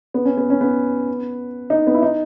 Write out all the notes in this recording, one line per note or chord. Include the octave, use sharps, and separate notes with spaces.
B3
C#4
B3
C#4
B3
D#4
B3
E4
D#4